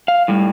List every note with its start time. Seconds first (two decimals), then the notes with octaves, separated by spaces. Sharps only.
0.08 F5
0.28 A2 G3